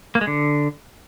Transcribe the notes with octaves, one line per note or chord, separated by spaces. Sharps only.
A#3
G#3
D3